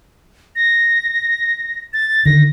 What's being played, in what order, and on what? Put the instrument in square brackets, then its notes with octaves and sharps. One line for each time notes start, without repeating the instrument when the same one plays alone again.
[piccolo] A#6
A6
[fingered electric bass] D3 D#3 [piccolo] A#6